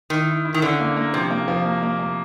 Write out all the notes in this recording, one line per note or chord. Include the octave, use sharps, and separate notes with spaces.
D#3 E4
E4
E4
D#3
D3 C#4
A#3
A#3
C3 F3
A#3
F3
A#3
A#3
A#3